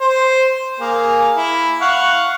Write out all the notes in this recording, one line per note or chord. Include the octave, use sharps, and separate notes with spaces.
C5
A#3 G#4
E4
F5 F#5 C#6